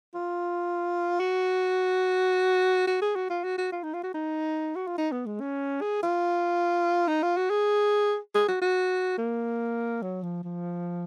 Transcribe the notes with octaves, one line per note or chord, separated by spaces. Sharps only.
F4
F#4
F#4
G#4
F#4
F4
F#4
F#4
F4
D#4
F4
F#4
D#4
F#4
F4
D#4
B3
G#3
C#4
G#4
F4
D#4
F4
F#4
G#4
G#4
F#4
F#4
A#3
F#3
F3
F3